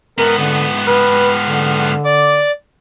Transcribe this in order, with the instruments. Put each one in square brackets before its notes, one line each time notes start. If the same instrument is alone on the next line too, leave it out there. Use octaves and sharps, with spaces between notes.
[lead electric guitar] G#2 B3 [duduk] A#4
[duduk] D3
[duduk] B4 [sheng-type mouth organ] F6
[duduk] D3
[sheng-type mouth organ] D5 D6